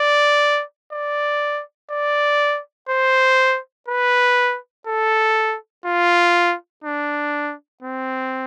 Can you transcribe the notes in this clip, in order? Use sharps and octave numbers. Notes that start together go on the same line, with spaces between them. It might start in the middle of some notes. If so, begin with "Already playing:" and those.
Already playing: D5
D5
D5
C5
B4
A4
F4
D4
C4